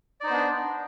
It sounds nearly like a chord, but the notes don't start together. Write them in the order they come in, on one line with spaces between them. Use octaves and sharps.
D5 D#4 C5 B3 D4